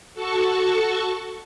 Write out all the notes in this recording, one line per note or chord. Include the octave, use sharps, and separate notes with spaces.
F#4 A4 A5 C#6